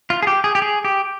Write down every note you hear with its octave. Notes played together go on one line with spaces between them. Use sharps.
F4
G#4
G4
G#4
G4
G#4
G4